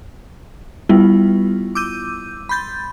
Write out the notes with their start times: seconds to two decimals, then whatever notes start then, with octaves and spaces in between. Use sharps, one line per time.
0.89 G3 B3 E4 F4
1.75 D6 E6 G6 D#7
2.49 B5 C6 G6 A6